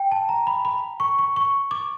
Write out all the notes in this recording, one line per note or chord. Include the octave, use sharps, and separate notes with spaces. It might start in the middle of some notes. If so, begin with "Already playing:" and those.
Already playing: G5
A5
A#5
B5
B5
C#6
C#6
C#6
D6